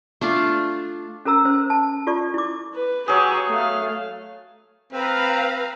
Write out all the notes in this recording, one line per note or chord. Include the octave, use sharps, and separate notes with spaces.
A3 D4 F4
C#4 A4 A#4 A#5 E6
C#4 C5
A5
F4 A4 D5 C#6
E4 D6
B4
F#3 G4 G#4 C#6
A3 F5
C4 B4 F5 A#5